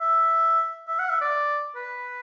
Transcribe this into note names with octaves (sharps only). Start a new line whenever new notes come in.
E5
E5
F#5
E5
D5
B4